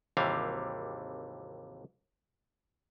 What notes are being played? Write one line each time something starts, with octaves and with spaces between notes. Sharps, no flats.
G#1 D#2 C3 E3 G3 F5